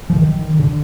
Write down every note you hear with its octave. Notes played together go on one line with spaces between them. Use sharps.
F3
D#3
D3